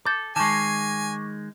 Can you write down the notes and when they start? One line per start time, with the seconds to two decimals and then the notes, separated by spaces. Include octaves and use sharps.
0.05 A4 D6 G6
0.36 D#3 G#3 G#5 A5 C#6 D6 E7